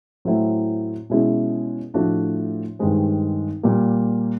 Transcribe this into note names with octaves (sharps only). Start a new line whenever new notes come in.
A2 F#3 A3 C4 E4
B2 G#3 C#4 E4 G#4
A2 F3 A3 D4 F#4
G2 D#3 G#3 C4
A#2 G3 A#3